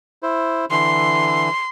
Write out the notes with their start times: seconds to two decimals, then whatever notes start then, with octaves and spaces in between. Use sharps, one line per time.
0.23 E4 C5
0.71 D3 E3 C6